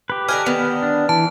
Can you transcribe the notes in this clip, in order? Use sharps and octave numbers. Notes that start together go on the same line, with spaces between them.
G4 B4
D3 D#5 G#5 F6
D3 D#3 B3
D4
E3 A5